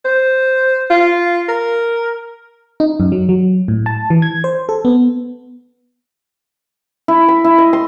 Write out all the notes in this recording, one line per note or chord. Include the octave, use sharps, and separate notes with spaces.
C5
F4
A#4
D#4
F#2
F#3
F#3
A2
A5
E3
G#6
C5
A4
B3
E4
B5
E4
D#5
C6